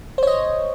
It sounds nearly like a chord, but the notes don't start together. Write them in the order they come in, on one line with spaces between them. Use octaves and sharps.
C5 C#5 D#5